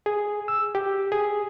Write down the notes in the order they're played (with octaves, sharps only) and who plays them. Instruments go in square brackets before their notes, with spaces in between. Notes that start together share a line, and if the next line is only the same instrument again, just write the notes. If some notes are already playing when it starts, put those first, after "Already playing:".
[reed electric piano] G#4
E6
G4
G#4